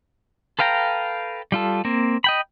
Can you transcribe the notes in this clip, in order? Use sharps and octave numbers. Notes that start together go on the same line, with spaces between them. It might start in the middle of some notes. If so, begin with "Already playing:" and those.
A4 B4 F5 G5 A#5
G3 F4 A4
A#3 C4
D#5 G5 B5